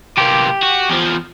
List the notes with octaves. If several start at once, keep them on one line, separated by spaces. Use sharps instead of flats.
C3 A#3 G4
F#4
E2 F3